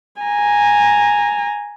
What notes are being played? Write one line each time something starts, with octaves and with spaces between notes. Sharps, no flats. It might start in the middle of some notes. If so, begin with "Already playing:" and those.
G#5 A#5